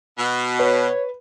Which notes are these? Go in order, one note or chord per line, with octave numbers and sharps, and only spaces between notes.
B2
B4 C#5